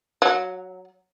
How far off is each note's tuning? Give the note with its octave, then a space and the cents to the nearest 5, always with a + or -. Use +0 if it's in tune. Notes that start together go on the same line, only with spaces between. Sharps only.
F#3 +0 F#5 -45